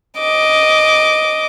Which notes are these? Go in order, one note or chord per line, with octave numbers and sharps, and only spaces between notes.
D#5 D6